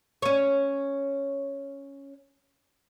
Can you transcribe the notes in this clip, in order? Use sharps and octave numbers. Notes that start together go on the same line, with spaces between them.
C#4 C#5